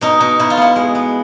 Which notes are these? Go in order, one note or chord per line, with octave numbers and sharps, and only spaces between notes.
B2 D#4
B2 D#4
B2 E4
F4
B3 E4
G#3
B3